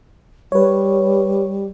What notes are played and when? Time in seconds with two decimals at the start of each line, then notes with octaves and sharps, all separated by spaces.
0.52 G3 B4 C#5